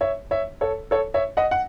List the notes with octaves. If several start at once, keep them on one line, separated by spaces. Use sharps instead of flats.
C#5 E5
C#5 E5
A4 C#5
A4 C#5
C#5 E5
D#5 F#5
F#5